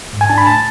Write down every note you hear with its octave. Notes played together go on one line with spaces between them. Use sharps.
G#2
G#5
D4 A5
B5
A2 A5